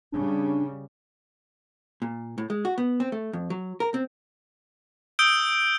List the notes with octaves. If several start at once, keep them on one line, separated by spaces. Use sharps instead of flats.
C#3 G3 D4
A#2
A2
G#3
F#4
B3
C4
A3
F2
F#3
A#4
C4
D#6 E6 G6 D7 G7